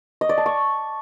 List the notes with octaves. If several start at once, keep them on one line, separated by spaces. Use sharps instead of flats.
D#5
D5
A5
C#6